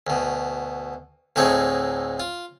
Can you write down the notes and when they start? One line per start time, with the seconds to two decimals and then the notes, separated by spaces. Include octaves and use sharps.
0.07 D2 B2
1.36 D2 A2 C4 D#4 G#4 C#6
2.20 F4